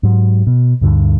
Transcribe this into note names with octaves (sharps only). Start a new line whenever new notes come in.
G#2 F#3
B2
D2 G2 D3